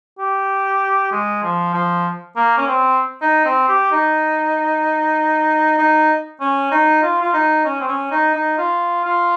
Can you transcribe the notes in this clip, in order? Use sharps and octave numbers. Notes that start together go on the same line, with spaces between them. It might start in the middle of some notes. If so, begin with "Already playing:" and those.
G4
G#3
F3
F3
A#3
C#4
C4
D#4
C4
G4
D#4
D#4
C#4
D#4
F4
F4
D#4
C#4
C4
C#4
D#4
D#4
F4
F4